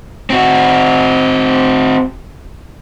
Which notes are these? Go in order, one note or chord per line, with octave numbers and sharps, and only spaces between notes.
C4 F#4